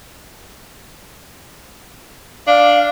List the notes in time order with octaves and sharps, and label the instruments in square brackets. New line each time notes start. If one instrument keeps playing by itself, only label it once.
[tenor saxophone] D4 [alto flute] F5